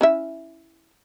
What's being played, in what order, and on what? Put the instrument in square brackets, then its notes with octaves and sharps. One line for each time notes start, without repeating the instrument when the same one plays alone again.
[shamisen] C#4 E4 E5